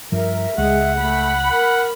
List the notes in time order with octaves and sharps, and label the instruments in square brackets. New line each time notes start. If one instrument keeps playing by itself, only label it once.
[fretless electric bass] G2 F3 [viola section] A#4 [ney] E5
[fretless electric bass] C#2 [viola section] G#3 [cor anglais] F#5
[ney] A3 [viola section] B5
[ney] A#4 [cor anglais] F#5